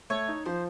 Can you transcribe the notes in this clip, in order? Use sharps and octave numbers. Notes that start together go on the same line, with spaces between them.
A3 C#5
D#4
F3 C5